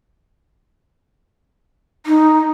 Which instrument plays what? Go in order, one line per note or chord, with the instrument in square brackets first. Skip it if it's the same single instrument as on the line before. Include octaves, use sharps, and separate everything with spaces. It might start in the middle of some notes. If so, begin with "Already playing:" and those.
[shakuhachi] D#4